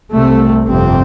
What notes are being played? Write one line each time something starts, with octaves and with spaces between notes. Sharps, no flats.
C2 C3 A3
G1 F2 C3 C4